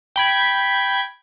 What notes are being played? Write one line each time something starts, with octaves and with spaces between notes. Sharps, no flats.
G5 B5 G#6